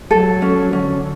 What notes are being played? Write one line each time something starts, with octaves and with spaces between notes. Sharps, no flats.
F#3 A4
C#4
D3 C#4